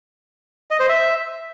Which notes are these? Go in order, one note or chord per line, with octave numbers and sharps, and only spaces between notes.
D#5
C5
E5